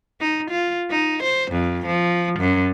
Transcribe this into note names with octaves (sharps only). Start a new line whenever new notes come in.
D#4
F4
D#4
C5
F2
F3
F#2